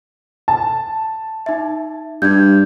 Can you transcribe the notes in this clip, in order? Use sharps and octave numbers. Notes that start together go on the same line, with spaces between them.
A5
D#4 E5
G2 G6 G#6